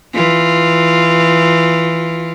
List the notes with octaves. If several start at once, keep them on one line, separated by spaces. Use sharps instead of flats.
E3 F4